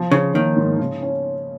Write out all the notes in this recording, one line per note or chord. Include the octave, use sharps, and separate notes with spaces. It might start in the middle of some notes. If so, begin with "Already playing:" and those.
Already playing: F3
C#3 C#4
D#3 A#3
G#2
C#3
C#4